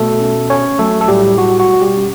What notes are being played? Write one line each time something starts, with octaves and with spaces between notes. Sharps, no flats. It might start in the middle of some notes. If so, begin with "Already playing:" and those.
Already playing: B2 A3 A4
C#4
C#4 C#5
F#3 A3 A4
A4
A2 G3 G4
G3 F#4
F#4
B2
G3 G4
C#4